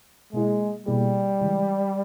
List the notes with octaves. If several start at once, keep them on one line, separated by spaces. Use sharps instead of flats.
B2 G#3 A#3 E4 G#4
B2 G3 A#3 E4 G#4
C#3 E3 G#3